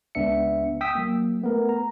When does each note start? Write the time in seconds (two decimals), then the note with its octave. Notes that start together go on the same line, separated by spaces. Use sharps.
0.15 C#2 B3 D4 E5 C#7
0.81 G5 D#6 E6 B6
0.95 F#3 A#3
1.41 A3 B3 A#4
1.69 A#5